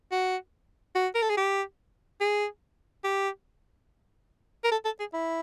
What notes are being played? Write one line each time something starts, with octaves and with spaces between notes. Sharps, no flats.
F#4
F#4
A#4
A4
G#4
G4
G#4
G4
A#4
A4
A4
G#4
E4